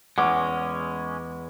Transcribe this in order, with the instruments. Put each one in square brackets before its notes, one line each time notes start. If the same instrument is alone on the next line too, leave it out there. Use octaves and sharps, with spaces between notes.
[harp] E2 C#6 [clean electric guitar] G#3 C#4 [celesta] F#5 [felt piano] D6